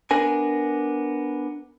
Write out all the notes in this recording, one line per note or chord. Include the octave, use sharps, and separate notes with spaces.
B3 D4 A#4 G#5